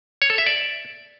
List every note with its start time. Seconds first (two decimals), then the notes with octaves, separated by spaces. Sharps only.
0.22 C#5
0.30 A4
0.38 E5
0.46 D5